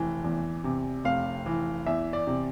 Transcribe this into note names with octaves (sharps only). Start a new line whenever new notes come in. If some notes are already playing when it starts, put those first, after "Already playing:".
Already playing: F1 E3
E2
C3
F1 F5
E3
E2 E5
D5
C3